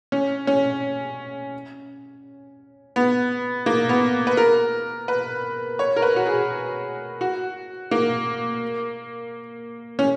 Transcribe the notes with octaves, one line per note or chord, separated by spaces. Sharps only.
C#4
C#4
B3
A#3
B3
B4
A#4
B4
C#5
A#4
B4
F#4
G#4
F#4
A#3
C#4